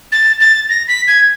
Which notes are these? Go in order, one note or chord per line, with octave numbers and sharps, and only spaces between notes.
A6
A6
A#6
B6
G#6